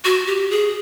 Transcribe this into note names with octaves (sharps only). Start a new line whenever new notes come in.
F#4
G4
G#4